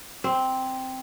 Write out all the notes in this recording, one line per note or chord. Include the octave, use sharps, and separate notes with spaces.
C4